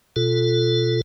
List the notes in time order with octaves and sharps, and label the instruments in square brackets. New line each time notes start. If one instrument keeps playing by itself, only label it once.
[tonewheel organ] B2 F4 A4